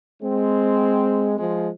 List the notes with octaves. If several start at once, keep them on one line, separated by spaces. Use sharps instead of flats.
G#3 C4
F3 G#3